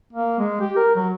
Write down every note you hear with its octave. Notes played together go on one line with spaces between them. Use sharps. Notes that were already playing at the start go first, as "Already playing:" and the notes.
A#3
G#3
G4
A#4
F#3